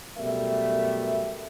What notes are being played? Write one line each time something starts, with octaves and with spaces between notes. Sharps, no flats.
F#2 B2 G3 A3 A#4 E5